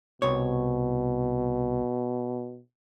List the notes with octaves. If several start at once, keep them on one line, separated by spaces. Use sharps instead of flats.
C2 B2 C#5